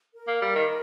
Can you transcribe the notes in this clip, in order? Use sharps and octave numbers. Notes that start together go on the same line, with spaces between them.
A#4
A#3
G3
D#3